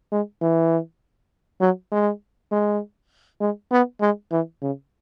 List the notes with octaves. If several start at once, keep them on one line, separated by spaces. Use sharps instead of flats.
G#3
E3
F#3
G#3
G#3
G#3
B3
G#3
E3
C#3